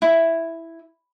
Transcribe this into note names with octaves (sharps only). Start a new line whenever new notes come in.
E4